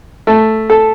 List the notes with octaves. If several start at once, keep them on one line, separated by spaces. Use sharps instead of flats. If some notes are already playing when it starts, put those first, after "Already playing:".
A3
A4